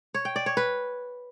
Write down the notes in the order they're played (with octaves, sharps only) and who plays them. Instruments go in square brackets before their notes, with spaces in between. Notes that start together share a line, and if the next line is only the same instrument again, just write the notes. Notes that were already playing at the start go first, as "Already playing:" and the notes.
[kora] C#5
G5
D5
C#5
B4